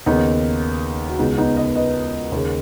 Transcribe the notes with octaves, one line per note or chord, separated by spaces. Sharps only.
D#2 C#3 B3 D#4
F#4
C#2 C#3 B3 D#4
B3 D#4
B4 D#5
B4 D#5
D#2 C#3